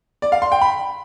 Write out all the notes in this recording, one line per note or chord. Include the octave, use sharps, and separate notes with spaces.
D5
F5
C6
G5
B5